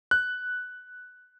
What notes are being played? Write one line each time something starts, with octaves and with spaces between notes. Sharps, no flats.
F#6